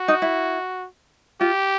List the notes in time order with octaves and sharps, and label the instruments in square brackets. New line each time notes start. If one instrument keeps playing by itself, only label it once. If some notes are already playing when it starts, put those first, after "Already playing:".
Already playing: [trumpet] F#4
[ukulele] D#4
E4
[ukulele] F4 [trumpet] G4